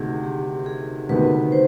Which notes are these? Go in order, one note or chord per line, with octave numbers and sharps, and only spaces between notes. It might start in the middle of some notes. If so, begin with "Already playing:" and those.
Already playing: D2 C3 D#3 G#4
G4
G#4
D2 C3 D#3 B3 B4
C5